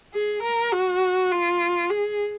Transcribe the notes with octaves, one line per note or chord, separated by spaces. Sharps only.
G#4
A#4
F#4
F4
G#4